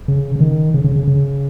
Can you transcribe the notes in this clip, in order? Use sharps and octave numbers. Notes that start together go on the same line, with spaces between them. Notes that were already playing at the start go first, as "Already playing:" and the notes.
C#3
C#3
D#3
C#3
C#3
C#3
C#3